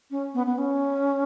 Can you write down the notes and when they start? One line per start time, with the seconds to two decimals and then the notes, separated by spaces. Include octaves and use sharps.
0.11 C#4
0.34 B3
0.46 B3
0.58 C#4